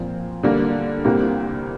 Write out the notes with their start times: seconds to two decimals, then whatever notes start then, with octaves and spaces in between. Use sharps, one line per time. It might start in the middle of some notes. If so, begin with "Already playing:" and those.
Already playing: A#2 F3 C4
0.43 D3 G3 A#3
1.05 C2 C3 G3 A#3